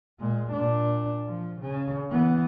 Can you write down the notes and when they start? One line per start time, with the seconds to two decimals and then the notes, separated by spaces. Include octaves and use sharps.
0.20 A#2 G#3
0.52 A#2 D4
1.26 F3
1.61 C#3
2.10 E3 B3